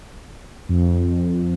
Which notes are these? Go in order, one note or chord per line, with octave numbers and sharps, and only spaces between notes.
F2